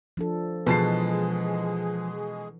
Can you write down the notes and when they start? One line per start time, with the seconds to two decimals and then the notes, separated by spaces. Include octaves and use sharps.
0.17 F3 D4 A4
0.67 B2 E3 F3 G#3 G#4 B4 A5 C7